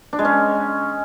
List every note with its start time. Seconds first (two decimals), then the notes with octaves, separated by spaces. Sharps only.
0.13 D4
0.19 G#3
0.25 C#4